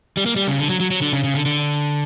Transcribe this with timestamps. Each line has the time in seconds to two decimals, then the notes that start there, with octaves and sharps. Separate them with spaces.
0.17 G3
0.26 A#3
0.36 G3
0.47 C#3
0.58 D3
0.70 F#3
0.80 F#3
0.91 F#3
1.02 D3
1.13 C#3
1.24 C#3
1.34 D3
1.45 D3